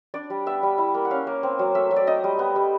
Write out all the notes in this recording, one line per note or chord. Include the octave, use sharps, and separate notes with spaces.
D4 D5
G3
B3 E5
G3
E4
A#3
F#5
C#4 F5
A#3
C4
F#3
A3 E5
F#3
D5
D#4 D#5
G3
B3
G3